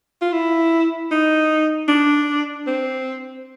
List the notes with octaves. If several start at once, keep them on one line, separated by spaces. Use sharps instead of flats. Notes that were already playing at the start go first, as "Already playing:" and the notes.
F4
E4
D#4
D4
C4